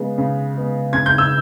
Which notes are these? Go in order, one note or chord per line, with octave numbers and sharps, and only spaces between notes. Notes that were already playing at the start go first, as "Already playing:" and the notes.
Already playing: C#3 G#3 B3
C#3
G#3 B3
C#3 G#6
G6
E6